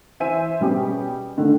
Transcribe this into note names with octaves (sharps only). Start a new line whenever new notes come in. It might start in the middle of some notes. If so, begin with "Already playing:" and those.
E3 C5 E5 G#5 D#7
B2 G3 C#4 G4 G#4
A2 D3 D#3